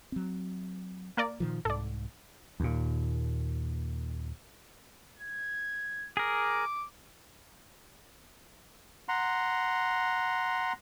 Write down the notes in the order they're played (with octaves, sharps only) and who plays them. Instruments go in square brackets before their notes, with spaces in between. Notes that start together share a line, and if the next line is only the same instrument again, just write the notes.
[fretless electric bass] F#3 C4
[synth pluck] A#3 A#4 D5
[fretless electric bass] A#2 D#3 F3
[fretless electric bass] C2 G#2 [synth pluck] A4 D5
[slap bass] D#2 A#2
[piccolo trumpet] G#6
[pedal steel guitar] G#4 A#4 [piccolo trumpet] D6
[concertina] F#5 A#5 C6